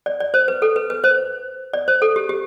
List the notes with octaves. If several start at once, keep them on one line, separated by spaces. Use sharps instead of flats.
D5
D5
C5
B4
A4
B4
B4
C5
D5
C5
A4
G4
G4